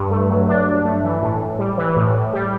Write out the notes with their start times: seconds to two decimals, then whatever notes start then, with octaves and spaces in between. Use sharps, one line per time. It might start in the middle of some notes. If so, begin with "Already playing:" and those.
Already playing: G2
0.11 A3
0.29 F#3
0.48 D4
0.66 G2
0.85 A3
1.04 E3
1.22 A2
1.41 A2
1.59 G3
1.77 E3
1.96 A2
2.14 A2
2.33 G3